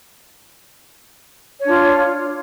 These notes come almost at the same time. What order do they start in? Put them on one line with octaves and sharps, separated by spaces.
C#5 D4 F4